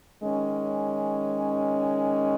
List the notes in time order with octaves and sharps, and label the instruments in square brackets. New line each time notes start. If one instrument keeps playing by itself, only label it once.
[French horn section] D#3 G#3 C#4